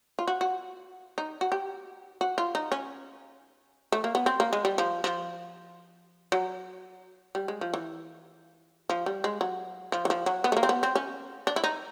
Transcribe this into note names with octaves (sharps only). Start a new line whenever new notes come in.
F4
F#4
F#4
D#4
F#4
G4
F#4
F4
D#4
C#4
A3
A#3
B3
C4
A#3
G#3
G3
F3
F3
F#3
G3
G#3
F3
E3
F3
G3
G#3
F#3
F3
E3
F3
F#3
B3
A3
A#3
C4
B3
C4
C#4
D4
E4
D#4